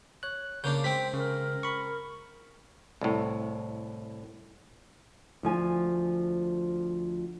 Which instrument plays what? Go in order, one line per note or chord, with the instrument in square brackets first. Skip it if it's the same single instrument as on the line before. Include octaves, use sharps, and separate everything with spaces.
[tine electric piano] C#5 F#6
[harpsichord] C#3 A#3 D4 [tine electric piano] G6
[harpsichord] G#3 C4 [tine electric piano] G5 B6
[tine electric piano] C#3 [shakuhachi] A#4
[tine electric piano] B5 C#6
[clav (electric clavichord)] C2 A2
[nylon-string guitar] D2 F3 G#5